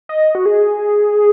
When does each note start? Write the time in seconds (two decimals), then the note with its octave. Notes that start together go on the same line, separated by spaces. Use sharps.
0.09 D#5
0.35 F#4
0.46 G#4